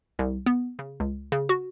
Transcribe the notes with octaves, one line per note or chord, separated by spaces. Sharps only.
C2
B3
C#3
C#2
C#3
F#4